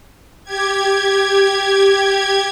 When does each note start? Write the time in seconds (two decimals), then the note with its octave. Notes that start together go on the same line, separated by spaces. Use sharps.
0.44 G4 G#6